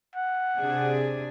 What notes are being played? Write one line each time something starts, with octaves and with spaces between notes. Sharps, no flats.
F#5
C3 D4 G#4